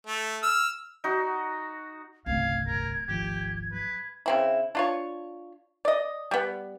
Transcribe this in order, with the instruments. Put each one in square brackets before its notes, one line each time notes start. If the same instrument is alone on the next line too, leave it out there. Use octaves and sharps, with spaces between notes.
[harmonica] A3
E6 F6
[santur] D#4 F#4
[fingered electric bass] G1 C2 C#3 [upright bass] A3 C4 [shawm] F5 [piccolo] G#6
[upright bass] D1 [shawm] A#4
[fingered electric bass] G#1 F3 [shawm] G4
[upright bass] F#3 [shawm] B4
[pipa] C#3 C4 E4
D4 F4 C#5
D5 D#5
G3 B3